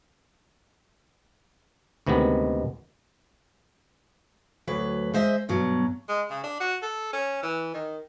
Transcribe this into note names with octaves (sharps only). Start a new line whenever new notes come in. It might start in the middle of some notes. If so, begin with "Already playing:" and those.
D2 C3 D#3 G#3 B3
D2 F#3 B4
G#3 C5 D#5 E5
G2 B2 F#3
G#3
C#3
D4
F#4
A4
C#4
E3
D#3